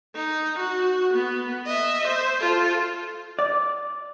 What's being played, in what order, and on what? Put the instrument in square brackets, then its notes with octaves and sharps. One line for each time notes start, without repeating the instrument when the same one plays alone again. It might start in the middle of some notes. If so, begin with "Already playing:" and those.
[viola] D#4
F#4
B3
D#5 E5
C5
F4 A4
[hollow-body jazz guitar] D5